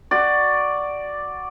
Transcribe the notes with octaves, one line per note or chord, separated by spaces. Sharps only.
F#4 D5